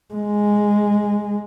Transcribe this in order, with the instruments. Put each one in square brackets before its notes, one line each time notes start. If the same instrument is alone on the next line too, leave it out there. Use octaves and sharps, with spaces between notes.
[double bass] G#3